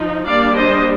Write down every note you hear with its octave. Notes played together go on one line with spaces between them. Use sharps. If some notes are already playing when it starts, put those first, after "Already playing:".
Already playing: F3 D#4
G3 A#3 D4 D5 F5
C5 D#5